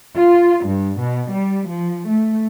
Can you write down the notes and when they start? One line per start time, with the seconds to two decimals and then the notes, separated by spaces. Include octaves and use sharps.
0.14 F4
0.65 G2
1.00 B2
1.30 G3
1.68 F3
2.07 A3